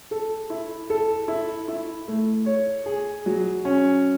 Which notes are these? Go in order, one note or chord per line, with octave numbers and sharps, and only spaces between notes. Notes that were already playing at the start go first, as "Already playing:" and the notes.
A4
E4
A4
E4
E4
A3
C#5
G#4
F#3
C#4